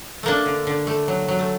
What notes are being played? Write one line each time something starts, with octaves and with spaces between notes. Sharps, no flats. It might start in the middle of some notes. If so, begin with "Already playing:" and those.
A3 A#3 D4
D3
D3
A3
F#3
F#3
A3